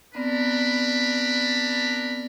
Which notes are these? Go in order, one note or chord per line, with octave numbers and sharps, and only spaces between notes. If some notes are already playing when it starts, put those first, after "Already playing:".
B3 C4 D4 A#4 D5 B5